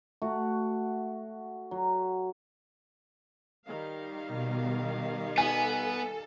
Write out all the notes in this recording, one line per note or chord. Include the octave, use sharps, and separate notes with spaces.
A3 F#4
F#3
D#3 G3 F5
B2
B3 A4 G#5